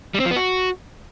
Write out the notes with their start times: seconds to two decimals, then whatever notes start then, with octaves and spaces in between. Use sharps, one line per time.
0.14 G3
0.20 C4
0.25 F3
0.31 B3
0.36 F#4